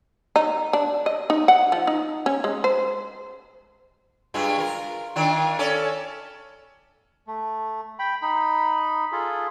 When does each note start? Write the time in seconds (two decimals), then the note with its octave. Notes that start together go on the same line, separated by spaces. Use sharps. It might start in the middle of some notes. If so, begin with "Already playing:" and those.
0.36 D#4
0.73 D4
1.06 D#5
1.30 D#4
1.48 F#5
1.72 F3
1.87 D#4
2.26 C#4
2.44 G#3
2.64 C5
4.34 G2 G#3 F4
4.58 F4 A#4
5.16 D#3 D4 F4
5.59 C#4 A4 D5
7.27 A3
7.99 G5 B5
8.22 D#4 B5
9.12 F4 G#4 A4